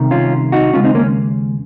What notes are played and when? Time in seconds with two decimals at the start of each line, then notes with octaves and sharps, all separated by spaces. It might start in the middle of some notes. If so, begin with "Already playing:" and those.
Already playing: C2 C3 D#3
0.11 C#4 F4
0.52 D#4 F#4
0.73 D#2 C#3 G#3 C#4 F4
0.84 C4 D#4
0.95 A#3 C#4